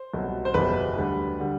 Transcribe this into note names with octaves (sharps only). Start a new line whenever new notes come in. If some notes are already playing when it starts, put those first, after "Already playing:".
Already playing: C5
C2 B2 F#3
C5
F#1 E2 B2 G3 B4
D2 D3 G3
D3 G3